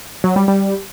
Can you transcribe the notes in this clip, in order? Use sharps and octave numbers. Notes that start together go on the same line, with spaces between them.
F#3
G3
G3